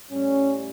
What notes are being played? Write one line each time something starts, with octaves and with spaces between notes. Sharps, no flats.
A2 G3 C#4